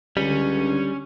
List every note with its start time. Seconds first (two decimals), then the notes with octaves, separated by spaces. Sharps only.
0.17 C#2 D3 G3 C#4